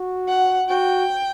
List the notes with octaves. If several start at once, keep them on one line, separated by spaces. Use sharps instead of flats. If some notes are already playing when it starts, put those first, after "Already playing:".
Already playing: F#4
F#5
F#4 G5